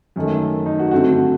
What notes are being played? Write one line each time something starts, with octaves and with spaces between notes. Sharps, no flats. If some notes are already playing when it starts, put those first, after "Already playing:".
F#2 D#3 A3
D#4
F#4
G2 D3 A3 C4 F#4